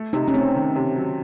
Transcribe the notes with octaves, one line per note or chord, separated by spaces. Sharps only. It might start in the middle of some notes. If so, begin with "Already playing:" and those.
Already playing: A3
C3 D#4
C#4
A3 C4
D#3
C3
F#3